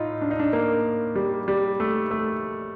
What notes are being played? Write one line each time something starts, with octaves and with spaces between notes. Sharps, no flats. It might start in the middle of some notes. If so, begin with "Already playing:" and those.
Already playing: A2 D#4 F4
D4
D#4
D4
A#3
G3
G3
A3
A3